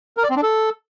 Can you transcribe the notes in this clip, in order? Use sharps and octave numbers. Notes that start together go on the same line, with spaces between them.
A#4
D5
C4
D4
A4